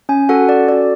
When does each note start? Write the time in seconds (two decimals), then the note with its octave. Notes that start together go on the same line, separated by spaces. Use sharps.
0.09 C#4 G#5
0.29 F#4 A4 F#5
0.49 C#4 D5
0.68 F#4 A4 D5